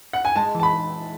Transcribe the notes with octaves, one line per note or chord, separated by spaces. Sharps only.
F#5
G#5
G#3 A5
E3 A5
B5